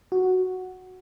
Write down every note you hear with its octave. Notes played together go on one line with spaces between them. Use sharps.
F#4